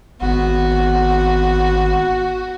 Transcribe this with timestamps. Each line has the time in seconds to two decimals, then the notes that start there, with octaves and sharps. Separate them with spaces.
0.21 G#1 B3 F#4